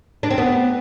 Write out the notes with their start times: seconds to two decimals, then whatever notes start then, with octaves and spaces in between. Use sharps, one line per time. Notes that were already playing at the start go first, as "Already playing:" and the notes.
0.23 D4
0.30 C4
0.38 B3